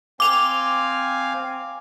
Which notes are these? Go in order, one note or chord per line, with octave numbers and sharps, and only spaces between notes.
C4 F5 G#5 D6 F7